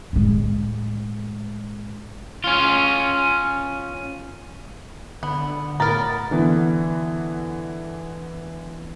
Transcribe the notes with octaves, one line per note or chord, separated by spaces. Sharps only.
A2 G#3
C#4 F4
D3 B3
A2 B3 A#4 A#5 A6
D3 E3 B3